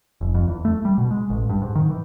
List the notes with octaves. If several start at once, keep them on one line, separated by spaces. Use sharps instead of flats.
F1
F2
E2
A3
G3
B2
G#3
A1
G2
G#2
D#3
E3